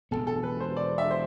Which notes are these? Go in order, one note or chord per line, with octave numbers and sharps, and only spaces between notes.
E1 E2 B2 B3 A4
A4
B4
C5
D5
E5
C5